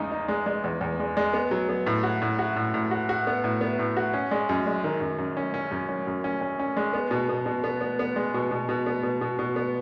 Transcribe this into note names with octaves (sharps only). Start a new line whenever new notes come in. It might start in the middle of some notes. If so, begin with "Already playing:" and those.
Already playing: E2 C#3 G#3 D#4
D#4
G#3
G#3
E2
E2
G#3
G#3
B3
F#3
B3
A2
F#4
A2
F#4
A2
A2
F#4
F#4
B3
A2
B3
A2
F#4
C#4
G#3
F#2
G#3
D#3
F#2
F#2
C#4
C#4
F#2
C#4
F#2
C#4
C#4
C#4
G#3
B3
B2
B2
B2
B3
B3
B3
G#3
B2
B2
B2
B3
B2
B2
B2
B3